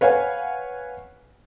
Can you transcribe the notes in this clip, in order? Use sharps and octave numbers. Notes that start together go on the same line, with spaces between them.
B4 C#5 F5 F#5 G#5